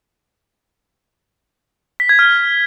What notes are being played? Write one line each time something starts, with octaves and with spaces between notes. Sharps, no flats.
B6
G#6
F6